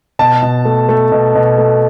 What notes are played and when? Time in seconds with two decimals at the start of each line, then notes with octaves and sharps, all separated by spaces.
0.19 B2 A5
0.42 B2
0.65 A3
0.89 A3
1.12 B2
1.35 B2
1.58 A3